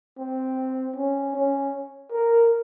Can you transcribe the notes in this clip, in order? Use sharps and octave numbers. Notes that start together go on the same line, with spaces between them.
C4
C#4
C#4
A#4